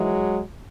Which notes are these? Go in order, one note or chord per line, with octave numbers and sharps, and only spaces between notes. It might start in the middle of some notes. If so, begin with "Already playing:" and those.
Already playing: G#2 E3 F#3 G#3